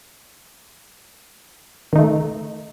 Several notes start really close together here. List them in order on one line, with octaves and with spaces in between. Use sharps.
D#3 D#4 A3